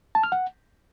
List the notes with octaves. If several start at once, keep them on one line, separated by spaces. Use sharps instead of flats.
A5
F6
F#5